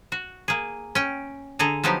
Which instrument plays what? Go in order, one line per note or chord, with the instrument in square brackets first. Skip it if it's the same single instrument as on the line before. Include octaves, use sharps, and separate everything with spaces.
[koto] F#4
A#3 G#4
C#4 G5
D3 G#4 A4 A#5
F3 F#3 B3 D#4 G4